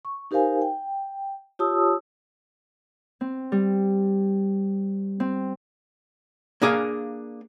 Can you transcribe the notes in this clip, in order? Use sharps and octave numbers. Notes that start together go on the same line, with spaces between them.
C#6
D#4 G4 A#4 C5 F5 G#5
G5
F4 G4 C#5 A5 D#6 E6
C4
G3
C4
A#3 D4 G#4 F5